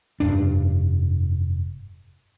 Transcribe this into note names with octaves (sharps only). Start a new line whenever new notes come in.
F1 G2 D4